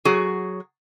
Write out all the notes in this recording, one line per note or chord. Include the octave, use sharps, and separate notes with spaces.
F#3 F#4 G#4